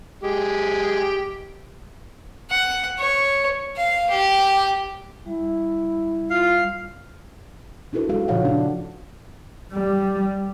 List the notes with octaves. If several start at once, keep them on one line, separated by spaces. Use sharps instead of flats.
G#3 G4
F#5
C#5
F5
G4
G3 E4
F4 F5
D4 E4 F#4 A4 B4
G#3 F#4 A4 F5
A#2 C#3 F3 C#5 F5 F#5
D4
G3